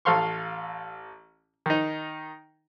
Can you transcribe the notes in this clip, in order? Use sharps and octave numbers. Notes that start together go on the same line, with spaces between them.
A1 A4 F5 C6 C#6
D#3 D#4